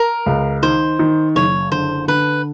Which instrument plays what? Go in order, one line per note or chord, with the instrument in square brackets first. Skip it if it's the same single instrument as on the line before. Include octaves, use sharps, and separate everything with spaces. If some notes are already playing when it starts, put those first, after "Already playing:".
Already playing: [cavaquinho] A#4
[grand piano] C#2
[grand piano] D#3 [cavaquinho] C5
[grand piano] D#3
[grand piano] F#1 [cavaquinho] C#5
[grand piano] D3 [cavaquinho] C5
[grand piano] D3 [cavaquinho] B4